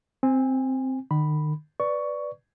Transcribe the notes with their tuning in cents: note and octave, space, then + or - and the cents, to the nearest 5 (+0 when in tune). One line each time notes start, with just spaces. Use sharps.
C4 +0 G#5 -25
D#3 -40 B5 +0
B4 +0 D5 +0 C#6 +15